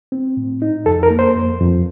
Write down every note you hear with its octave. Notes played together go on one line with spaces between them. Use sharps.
C4
A2
D#4
F2 A4
A#4
A#3
C5
F2
F2